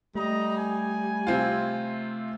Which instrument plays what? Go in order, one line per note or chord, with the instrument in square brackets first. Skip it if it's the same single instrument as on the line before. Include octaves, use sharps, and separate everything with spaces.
[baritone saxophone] G3 [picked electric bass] A3 [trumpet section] D#5 A#5
[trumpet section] G#5
[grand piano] C3 C4 F4